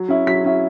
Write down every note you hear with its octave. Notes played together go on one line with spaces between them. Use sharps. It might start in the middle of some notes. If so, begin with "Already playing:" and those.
Already playing: F#3
C#4 E4
F#3 B6
C#4 E4